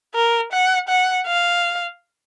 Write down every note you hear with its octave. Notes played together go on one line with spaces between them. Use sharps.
A#4
F#5
F#5
F5